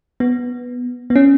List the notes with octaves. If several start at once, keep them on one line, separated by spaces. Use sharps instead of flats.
B3
B3
C#4